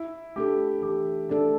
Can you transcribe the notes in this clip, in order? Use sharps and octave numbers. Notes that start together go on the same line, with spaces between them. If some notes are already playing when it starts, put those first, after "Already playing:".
Already playing: E4
A3 D4 G4 A4
E3 G4
A3 D4 A4 D5